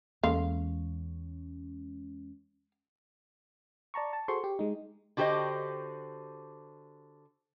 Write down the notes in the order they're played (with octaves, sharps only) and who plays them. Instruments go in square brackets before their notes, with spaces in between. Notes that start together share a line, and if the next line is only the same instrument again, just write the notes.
[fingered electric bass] E2 [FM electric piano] G#3 C#4 [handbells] A#3 A4 C6 [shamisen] F5
[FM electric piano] D5 A5 A#5 C#6
A5
F#4 G#4 A4 C5 C6 C#6
G4
G#3 D#4
[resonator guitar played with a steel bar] D3 F#4 G4 A4 C5 D#5